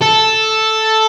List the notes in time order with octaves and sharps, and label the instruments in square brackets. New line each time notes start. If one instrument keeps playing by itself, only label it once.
[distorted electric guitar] A4